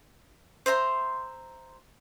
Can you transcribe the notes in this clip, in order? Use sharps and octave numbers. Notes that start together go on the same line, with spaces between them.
C5 E5 A#5 C6